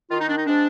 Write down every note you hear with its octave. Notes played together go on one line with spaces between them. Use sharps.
D#3 F4
D#4
D4
D#4
G#3 C4 D4